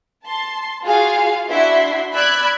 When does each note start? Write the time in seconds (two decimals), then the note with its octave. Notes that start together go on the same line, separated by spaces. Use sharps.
0.25 A5 C6
0.83 F4 F#4 G#4 F5
1.50 D4 E4 F#4 E5 C6
2.12 D5 B5 E6 F#6 G#6